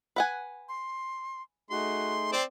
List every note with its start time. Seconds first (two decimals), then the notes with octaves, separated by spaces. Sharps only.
0.16 B4 F#5 G#5
0.69 C6
1.70 A3 D#4 F#4 G#4 C6
2.33 C4 C5 D5 G5